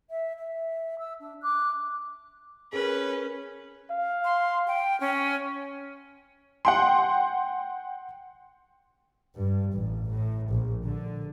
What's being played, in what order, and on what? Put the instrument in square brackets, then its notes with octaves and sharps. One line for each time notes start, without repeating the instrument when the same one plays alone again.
[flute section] E5
E5
E6
D4
D6 F#6
[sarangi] C#4 [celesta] G#4 [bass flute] A#4 [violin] B4
[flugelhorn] F5
[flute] C6
G5
C#4
[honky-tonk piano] F#5 G5 C6
[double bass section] G2
A1
A2
A#1
D3